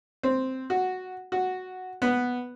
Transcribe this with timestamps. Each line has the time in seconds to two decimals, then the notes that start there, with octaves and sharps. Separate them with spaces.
0.23 C4
0.70 F#4
1.32 F#4
2.02 B3